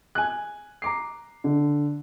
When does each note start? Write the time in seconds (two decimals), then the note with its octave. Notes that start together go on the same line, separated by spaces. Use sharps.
0.15 G#5 F#6
0.82 A#5 D6 C7
1.44 D3